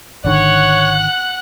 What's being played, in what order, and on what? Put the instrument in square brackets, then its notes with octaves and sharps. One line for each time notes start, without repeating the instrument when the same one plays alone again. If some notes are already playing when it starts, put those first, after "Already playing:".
[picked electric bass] G#1 D3 D#3 [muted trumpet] C#5 [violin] F#5 F#6